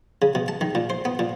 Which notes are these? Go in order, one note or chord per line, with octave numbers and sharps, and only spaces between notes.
C#3
B2
A5
D#3
A#2
C5
B3
A#2